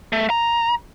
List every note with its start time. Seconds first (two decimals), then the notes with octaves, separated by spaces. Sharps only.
0.13 A3
0.30 A#5